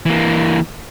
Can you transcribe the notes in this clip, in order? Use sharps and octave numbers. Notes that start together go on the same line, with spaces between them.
E3 A#3